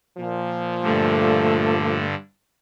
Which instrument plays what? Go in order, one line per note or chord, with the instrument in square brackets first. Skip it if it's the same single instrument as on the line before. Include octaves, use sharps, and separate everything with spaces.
[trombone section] A#2 F3
[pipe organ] G2 D3 [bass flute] A3